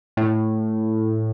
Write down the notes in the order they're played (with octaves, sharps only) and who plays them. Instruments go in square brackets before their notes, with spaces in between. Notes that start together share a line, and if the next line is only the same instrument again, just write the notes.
[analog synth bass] A2